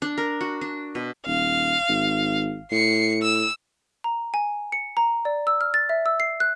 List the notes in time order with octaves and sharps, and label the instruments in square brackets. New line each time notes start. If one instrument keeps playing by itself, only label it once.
[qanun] D4
A#4
F#4
D4
B2
[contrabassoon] D#1 [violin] F5
[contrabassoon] G#1
[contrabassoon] A2 [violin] C7 C#7
[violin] E6
[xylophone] A#5
G#5
C#7
A#5
D5
E6
F6
A6
E5
E6
C7
F#6